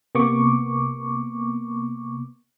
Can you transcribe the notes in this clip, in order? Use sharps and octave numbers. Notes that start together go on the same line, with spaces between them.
C3 A#3 B3 C#6 D6